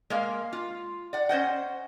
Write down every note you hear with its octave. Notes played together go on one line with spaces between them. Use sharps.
G#3 A#3 F5
F4
D5 F#5
C#4 C5 D#5 F#5